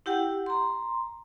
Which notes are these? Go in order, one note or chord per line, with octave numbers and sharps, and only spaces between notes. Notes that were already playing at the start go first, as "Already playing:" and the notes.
E4 G4 F#5 G5
A#5 C6